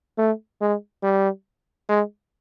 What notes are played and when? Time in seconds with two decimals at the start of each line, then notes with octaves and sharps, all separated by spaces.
0.18 A3
0.61 G#3
1.03 G3
1.89 G#3